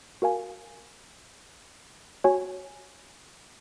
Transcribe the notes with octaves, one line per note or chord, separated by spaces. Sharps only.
F#4 A#4 F5 G#5
F#4 C#5 G#5